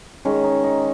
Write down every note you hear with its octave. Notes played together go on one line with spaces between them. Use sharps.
D#3 G#3 C#4
D#4
D#4